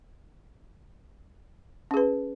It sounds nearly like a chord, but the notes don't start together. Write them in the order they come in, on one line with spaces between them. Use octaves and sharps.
C#4 G#4 B4